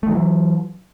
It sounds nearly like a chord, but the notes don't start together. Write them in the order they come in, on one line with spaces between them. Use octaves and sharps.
A3 D#3 F#3 E3